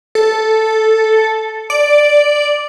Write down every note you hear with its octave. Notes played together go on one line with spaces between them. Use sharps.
A4
D5